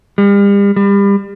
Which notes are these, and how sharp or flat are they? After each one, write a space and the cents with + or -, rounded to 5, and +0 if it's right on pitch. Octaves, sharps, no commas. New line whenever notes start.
G3 +40
G3 +30